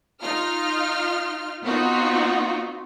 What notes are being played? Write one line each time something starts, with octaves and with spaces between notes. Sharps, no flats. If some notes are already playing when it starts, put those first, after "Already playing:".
D#4 F4 F6
B3 C4 D#4 F4 F#4